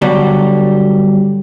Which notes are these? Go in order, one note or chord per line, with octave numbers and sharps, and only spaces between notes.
G2 B2 D3 F#3 G3